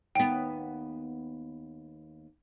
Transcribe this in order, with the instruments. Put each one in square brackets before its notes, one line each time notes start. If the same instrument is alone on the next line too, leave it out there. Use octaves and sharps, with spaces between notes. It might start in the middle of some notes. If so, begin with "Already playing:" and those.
[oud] D#2 B3 [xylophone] G5